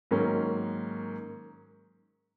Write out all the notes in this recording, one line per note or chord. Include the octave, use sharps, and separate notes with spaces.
G#2 D#3 F#3 A#3 C#4